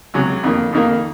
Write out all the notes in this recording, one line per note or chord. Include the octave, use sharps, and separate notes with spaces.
C#2 C3 F#3
F2 D#3 A#3
F2 D#3 A#3